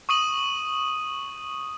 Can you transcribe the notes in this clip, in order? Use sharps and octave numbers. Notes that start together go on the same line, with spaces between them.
C#6 D#6 D#7 F#7